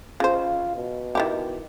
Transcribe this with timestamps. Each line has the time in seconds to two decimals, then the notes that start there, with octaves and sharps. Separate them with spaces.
0.20 C#3 F4 C5
0.76 B2
1.15 D#3 E4 G4